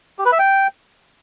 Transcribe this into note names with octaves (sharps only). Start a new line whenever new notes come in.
G4
B4
E5
G5